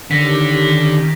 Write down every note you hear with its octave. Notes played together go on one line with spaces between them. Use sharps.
D3 D#3 C#4 G4 A#6 B6